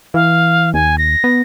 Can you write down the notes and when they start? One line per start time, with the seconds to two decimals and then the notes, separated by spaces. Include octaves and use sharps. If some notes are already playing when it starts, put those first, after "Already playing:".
0.14 E3 F5
0.74 D#2 G#5
0.98 A#6
1.24 B3